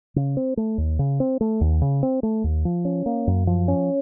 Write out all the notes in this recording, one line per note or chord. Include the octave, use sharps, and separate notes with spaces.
C#3
C4
A3
D#2
C#3
C4
A3
D#2
C#3
C4
A3
D#2
F3
C#4
A#3
F#2
F3
C#4